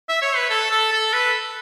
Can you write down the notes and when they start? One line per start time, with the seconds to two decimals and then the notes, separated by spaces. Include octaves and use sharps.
0.09 E5
0.22 C#5
0.36 B4
0.50 A4
0.71 A4
0.92 A4
1.13 B4